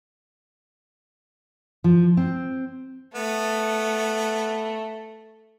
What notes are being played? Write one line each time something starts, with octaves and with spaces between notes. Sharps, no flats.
F3
C4
A3 B3